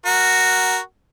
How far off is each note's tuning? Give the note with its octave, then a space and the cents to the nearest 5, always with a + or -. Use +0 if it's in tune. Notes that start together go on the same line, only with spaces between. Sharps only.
F#4 +0 A#4 +0